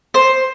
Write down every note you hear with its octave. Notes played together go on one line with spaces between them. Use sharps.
C5